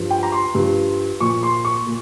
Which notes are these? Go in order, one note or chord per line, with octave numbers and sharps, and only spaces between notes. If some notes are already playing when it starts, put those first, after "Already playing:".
Already playing: G2 F3
G5
A#5
C6
G2 F3
A#2 F3 C#6
C6
C#6
A#2